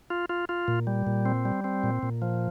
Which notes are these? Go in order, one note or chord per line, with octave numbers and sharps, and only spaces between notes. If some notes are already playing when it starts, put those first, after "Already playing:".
F4
F4
F4
A#2
G3
A#2
C4
G3
C4
A#2
A#2
F3